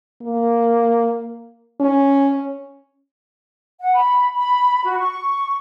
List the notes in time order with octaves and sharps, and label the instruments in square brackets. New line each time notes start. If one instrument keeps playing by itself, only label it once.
[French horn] A#3
C#4
[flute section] F#5
B5
B5
F#4
C#6